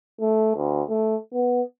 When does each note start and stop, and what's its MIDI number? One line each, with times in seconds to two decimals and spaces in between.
0.21 0.53 57
0.56 0.82 38
0.89 1.16 57
1.33 1.62 59